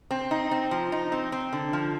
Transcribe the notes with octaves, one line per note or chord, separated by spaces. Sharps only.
C4
D#4
C4
F3
D#4
C4
C4
D3
F3